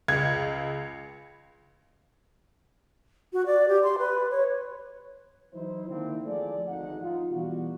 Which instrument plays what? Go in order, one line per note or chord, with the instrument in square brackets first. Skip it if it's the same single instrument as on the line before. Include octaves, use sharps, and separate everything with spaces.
[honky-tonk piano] C#2 [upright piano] G#6
[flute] F#4
D5
G4
C6
B4
C#5
[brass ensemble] E3 F#3 D#4 E4 C5
D3 D#3 A#3 C4 D4 E4
F3 A3 F4 G#4 A4 D5
G#1 D2 D#4 F#5
F3 D#4 F4
B2 E3 G3 F4 F#4